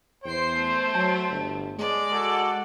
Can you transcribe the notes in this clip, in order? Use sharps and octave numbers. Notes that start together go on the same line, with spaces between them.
E2 C5 G5 C7
A3
F#3 A5
G1
G#3 D5
F#4 A4